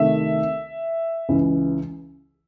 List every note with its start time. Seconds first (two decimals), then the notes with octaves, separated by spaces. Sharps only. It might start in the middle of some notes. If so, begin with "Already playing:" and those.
Already playing: C2 C3 D#3 A3 E5
1.29 C#2 C#3 E3